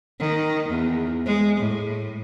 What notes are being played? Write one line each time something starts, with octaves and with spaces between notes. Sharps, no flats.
D#3
E2
G#3
A2